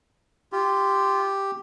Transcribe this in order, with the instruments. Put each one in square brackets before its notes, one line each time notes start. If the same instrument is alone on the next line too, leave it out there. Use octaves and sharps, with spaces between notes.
[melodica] F4 [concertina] G4